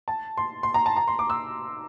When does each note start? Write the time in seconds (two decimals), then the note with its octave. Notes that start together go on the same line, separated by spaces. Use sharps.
0.08 A5
0.37 C6
0.63 C6
0.74 A#5
0.86 A5
0.97 A#5
1.08 C6
1.19 D6
1.30 E6